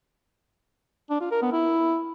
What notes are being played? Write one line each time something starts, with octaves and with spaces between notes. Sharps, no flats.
D4
F4
A#4
B3
E4